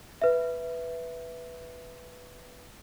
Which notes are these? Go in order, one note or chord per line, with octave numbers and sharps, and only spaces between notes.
B4 E5